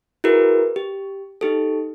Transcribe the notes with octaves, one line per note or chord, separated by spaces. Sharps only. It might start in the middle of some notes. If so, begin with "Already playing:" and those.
E4 F#4 G#4 A#4 B4
G4
D#4 G4 A4